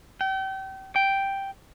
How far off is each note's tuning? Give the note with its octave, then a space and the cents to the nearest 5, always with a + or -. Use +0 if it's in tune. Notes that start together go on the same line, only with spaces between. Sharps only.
G5 -35
G5 +0